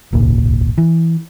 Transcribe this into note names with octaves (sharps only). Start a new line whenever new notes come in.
D#1 G#1 C#2 A#2
E3